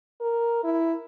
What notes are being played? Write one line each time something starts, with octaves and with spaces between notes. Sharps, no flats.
A#4
E4